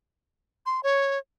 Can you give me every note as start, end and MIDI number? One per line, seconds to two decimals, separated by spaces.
0.66 0.83 84
0.83 1.19 73